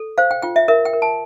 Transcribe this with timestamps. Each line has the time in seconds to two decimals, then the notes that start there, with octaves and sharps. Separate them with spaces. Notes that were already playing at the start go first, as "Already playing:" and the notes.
Already playing: A4
0.18 C5 F5
0.31 G5
0.43 F4 G5
0.56 E5
0.68 A#4 E5
0.85 G5
0.93 A#4
1.02 A5